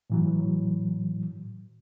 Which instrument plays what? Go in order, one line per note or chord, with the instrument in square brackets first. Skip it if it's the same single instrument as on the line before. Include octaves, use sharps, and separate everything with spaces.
[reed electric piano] A2 E3 F#3